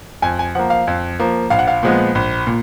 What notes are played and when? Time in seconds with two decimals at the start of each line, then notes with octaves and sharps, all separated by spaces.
0.22 F2 G#5
0.39 G#5
0.55 F3 F#5
0.59 A#3
0.70 F5
0.87 F2
1.19 F3 A#3
1.50 A#1 F5
1.59 F#5
1.68 F5
1.83 A#2 F3 G#3 B3
2.15 A#1
2.47 A#2